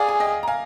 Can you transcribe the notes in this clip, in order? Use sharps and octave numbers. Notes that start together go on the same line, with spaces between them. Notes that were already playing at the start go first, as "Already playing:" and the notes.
Already playing: G#4 D5 F5
G#5
D#5 G5
A#5
F5 G#5